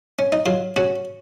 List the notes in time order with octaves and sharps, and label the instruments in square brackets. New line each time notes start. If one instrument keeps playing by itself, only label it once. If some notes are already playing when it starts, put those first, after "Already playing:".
[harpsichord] C#4
D#4
F#3 F4
C#4 F#4